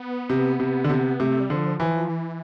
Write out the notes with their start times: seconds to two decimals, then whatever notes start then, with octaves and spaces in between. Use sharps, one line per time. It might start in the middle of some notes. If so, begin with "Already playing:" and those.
Already playing: B3
0.30 C3
0.60 C3
0.84 D3
0.90 C3
1.20 C3 A3
1.30 A3
1.40 G3
1.50 D3 F3
1.80 E3 F3
2.09 E3